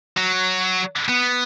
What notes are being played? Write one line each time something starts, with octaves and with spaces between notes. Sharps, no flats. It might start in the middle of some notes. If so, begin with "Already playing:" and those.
F#3
B3